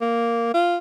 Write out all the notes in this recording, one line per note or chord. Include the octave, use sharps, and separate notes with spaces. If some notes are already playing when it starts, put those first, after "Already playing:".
A#3
F4